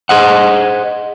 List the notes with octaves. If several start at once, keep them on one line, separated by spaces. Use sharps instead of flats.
G#4 C5 D#5 F#5